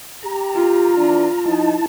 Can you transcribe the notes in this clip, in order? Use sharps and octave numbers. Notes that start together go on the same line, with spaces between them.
G4 A#5
F4
E3 D4
F3 D#4 E4 A5